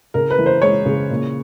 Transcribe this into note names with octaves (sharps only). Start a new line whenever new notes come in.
C#3 A#4
B4
E3
C5
G#3 C#5
C#3
A#2